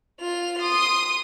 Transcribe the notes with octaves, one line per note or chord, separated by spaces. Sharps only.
F4 F7
C6 D#6